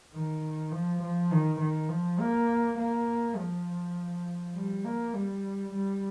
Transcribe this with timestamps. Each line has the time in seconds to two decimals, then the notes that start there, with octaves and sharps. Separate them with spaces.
0.13 D#3
0.71 F3
1.02 F3
1.31 D#3
1.60 D#3
1.89 F3
2.19 A#3
2.78 A#3
3.36 F3
4.55 G3
4.85 A#3
5.14 G3
5.73 G3